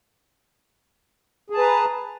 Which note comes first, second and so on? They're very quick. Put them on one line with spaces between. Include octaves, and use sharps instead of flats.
G#4 A5 B4 A#5